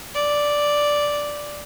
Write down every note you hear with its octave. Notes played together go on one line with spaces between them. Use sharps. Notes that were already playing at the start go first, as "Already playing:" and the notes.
D5